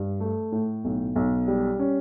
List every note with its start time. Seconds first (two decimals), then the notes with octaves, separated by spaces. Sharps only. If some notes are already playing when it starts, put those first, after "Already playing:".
Already playing: G2
0.20 A3
0.52 A2
0.84 B1
1.16 B1
1.48 G3
1.79 C#4